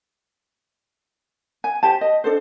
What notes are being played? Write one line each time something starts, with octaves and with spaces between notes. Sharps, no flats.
G#5
G4 C5 A5
D#5
D4 A4 C5